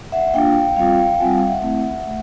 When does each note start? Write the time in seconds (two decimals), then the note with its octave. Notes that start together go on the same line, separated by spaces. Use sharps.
0.12 E5 F#5
0.34 A#3 D4 F4 F5 G5
0.76 G3 C4 F4 F5 G5
1.15 G5
1.19 G3 C4 F4 F#5 G#5
1.34 F5 G5
1.48 E5 F#5
1.62 A3 C4 E4
2.06 A3